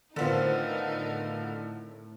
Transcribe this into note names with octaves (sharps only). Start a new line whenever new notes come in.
A2 D3 D#3 B3 C4 D#4 F4 A#4